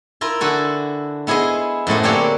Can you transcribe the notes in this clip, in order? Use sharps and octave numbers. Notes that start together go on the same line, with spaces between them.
E4 F4 A#4
D3 F#4 A4 G#5
B3 E4 G#4 C5 D#5
F#2 A2 A3 C5
D3 A#3 C4 D4 G4 C#5